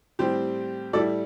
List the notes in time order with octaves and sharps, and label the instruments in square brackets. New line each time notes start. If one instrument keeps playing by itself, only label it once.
[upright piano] A2 G3 C4 G4 C5
A2 G3 E4 A4 D5